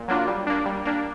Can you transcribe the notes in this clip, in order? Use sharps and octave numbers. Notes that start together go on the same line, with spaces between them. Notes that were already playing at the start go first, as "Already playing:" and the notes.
Already playing: A#2
F#3 A#3 D4 F4
G3
A#3 D4
G3
A#3 D4